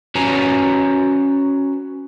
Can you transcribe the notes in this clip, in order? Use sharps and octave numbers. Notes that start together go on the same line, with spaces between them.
C#4 F#4 B4 C#5 G#5 A#5